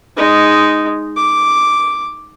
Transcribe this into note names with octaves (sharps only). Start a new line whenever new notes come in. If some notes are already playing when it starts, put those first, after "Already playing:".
G#3 D#4
D6